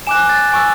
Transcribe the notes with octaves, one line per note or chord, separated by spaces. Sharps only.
G#5 D6 F#6 E7
A6
G#5 C#6 E6 A6